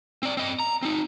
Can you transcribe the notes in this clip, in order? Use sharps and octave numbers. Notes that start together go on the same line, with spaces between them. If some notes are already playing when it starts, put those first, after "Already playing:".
C4 D5
C4 D#5
A#5
C4 D#4